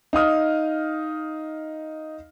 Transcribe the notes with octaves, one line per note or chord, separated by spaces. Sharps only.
D#4 F5 D#6 F6